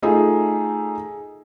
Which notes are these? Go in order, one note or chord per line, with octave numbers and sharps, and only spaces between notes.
A3 D#4 F4 G#4